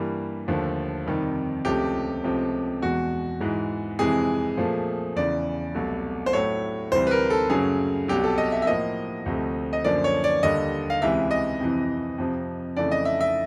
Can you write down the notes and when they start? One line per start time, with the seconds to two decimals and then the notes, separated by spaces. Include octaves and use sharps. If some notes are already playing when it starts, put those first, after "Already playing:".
Already playing: G2 E3 G3 A#3
0.48 D#2 D3 F3 A3
1.07 F2 C3 D#3 G3
1.65 C#2 C3 F3 A3 G4
2.24 C#2 C3 F3 A3
2.82 E2 B2 G#3 F#4
3.40 G#2 E3 G#3
3.99 F2 C3 E3 G#3 G#4
4.57 A#2 F3 A3
5.16 E2 C#3 E3 D5
5.74 C2 B2 F#3 A3
6.26 C5
6.33 A2 F#3 A3 C#5
6.92 D2 C3 E3 G3 C5
7.07 B4
7.11 A#4
7.30 A4
7.50 F#2 C#3 F#3 A3 G#4
8.08 C2 B2 F#3 G4
8.24 A4
8.38 D#5
8.52 E5
8.62 E5
8.67 A2 F3 A#3 D#5
9.26 D2 C3 F3 A3
9.73 D#5
9.84 F#2 D3 F3 A#3 D5
10.04 C#5
10.24 D5
10.43 D#2 D3 G3 D#5
10.90 F5
11.02 C#2 C3 E3 G#3 E5
11.31 D#5
11.60 F2 C3 E3
12.18 F2 C3 F3
12.77 F2 C#3 E3 A3 D5
12.92 D#5
13.05 E5
13.21 E5